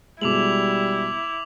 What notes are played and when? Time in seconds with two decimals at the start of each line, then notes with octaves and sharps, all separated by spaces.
0.21 B2 G3 G#3 E4 D6 F7 F#7